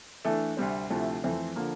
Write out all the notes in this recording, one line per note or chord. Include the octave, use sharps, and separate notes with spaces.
E3 A3 D4
D2 C3 G3 C4
D2 C3 F3 A3 E4
F2 E3 A3 C4
D3 F3 A#3